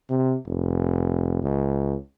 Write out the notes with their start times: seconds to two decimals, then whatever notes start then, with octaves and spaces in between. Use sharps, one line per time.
0.10 C3
0.47 F1
1.43 C#2